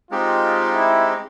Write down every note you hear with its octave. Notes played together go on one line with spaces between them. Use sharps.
G#3 C4 D#4 F4 G4
E4